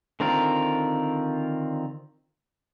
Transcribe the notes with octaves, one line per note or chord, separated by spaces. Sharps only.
D3 D#3 C4 F4 A#4